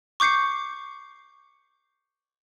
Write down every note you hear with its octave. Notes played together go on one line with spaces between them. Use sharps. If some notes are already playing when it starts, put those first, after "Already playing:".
C#6 D6 G6 C7 C#7